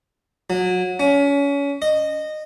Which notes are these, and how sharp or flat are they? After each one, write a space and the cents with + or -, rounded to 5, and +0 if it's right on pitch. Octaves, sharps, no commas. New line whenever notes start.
F#3 -25
C#4 +30
D#5 -15